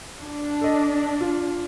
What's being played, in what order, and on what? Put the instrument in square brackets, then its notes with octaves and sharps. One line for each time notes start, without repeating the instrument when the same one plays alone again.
[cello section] D4
[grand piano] A4 D#5
F4